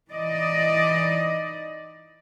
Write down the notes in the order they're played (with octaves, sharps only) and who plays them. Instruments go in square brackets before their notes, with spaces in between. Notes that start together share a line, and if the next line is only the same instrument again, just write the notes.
[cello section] E3 D#4 D5 D#5